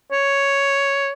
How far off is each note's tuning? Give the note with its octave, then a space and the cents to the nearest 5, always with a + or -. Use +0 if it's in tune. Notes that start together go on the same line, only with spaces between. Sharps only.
C#5 +5